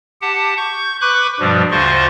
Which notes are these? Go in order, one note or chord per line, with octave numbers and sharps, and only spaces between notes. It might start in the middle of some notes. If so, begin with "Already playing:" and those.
G4 F#5 A5
C#6 G6
B4 B5 C#6 D6 F#6
G2 B2 F3 G3
D2 C#3 F4 C5 D#5 C#6